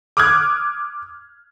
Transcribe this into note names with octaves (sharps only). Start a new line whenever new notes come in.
D6 D#6 F6 F#6 G#6